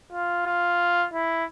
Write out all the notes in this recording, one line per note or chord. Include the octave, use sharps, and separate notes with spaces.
F4
F4
E4